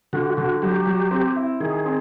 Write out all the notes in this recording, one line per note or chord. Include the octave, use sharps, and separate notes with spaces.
D3 F#4
D3 F#4
F#3 G4
F#3
C4
E4
D#3 G#4
C4